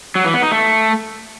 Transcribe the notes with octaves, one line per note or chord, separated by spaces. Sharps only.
F#3
E3
B3
D#4
A3